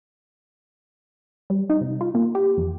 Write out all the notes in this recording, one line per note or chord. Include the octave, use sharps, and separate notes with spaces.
G3
D#4
C3
F4
A#3
G4
F2